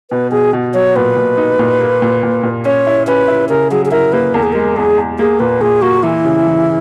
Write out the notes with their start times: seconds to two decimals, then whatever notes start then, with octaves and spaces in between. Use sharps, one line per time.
0.11 B2 B4
0.32 B2 G#4
0.53 B2
0.74 F#3 C#5
0.96 A#2 B4
1.16 A#2
1.38 D#4
1.59 A#2
1.81 A#3
2.02 A#2
2.23 A#2
2.43 A#2
2.65 C#4 C#5
2.87 E4
3.07 C#4 B4
3.28 E4
3.49 C#3 A#4
3.71 F#3 G#4
3.86 G#4
3.91 E4 A#4
4.12 A#3 B4
4.34 E2 A#4
4.43 G#4
4.53 G#3 A#4
4.76 E2 G#4
4.97 E2
5.19 A#3 G#4
5.40 A#2 B4
5.61 A#2 G#4
5.82 A#3 F#4
6.03 E3 E4
6.25 C#3
6.46 E3